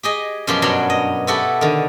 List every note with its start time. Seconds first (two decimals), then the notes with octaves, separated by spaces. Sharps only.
0.03 G4 G#4 D#5
0.47 F#2 B2 F3 G4 C#5 C6
0.62 G2 B2 F#3 D4 A#5 C6
0.90 D#5
1.27 B3 E4 F#4 G4 A4
1.61 D3 D#3